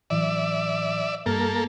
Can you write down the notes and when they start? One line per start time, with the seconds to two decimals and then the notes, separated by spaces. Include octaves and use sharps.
0.10 A2 E3 F#3 D5 E5
1.26 G2 G3 A#3 A4 F6